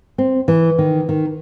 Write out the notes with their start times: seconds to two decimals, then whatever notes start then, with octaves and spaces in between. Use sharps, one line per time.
0.18 C4
0.48 E3
0.78 D#3
1.09 D#3